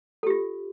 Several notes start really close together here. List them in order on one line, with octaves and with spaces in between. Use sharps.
A4 G4 F4